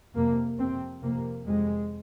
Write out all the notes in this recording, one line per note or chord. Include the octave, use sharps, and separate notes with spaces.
F2 C3 A#3
F2 C3 C4
F2 C3 A#3
F2 C3 G#3